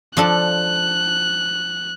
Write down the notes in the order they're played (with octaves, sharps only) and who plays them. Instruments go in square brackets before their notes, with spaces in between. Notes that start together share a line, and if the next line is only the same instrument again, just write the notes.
[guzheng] F3 D4 A4 [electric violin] F#6